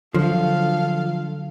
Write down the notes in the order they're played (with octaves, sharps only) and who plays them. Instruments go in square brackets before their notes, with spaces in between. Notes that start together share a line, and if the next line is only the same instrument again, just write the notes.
[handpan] D3 F#3 [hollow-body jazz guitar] F3 [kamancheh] A4 F5